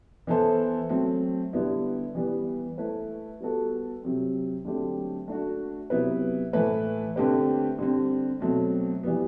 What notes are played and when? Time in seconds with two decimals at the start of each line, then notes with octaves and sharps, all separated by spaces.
0.27 E3 B3 E4 A4 C5
0.90 F#3 A3 C4
1.53 D3 G3 B3 E4
2.15 E3 G3 B3
2.78 A3 E4 B4
3.40 G3 B3 F#4 A4
4.02 C3 F#3 C4
4.65 D3 F#3 A3 C4 G4
5.28 A3 D4 F#4
5.90 C3 F#3 B3 E4 B4
6.53 A2 E3 A3 E4 B4
7.16 D3 A3 C4 G4 B4
7.79 D3 G3 C4
8.40 B2 F#3 A3 C4
9.03 E3 G3 B3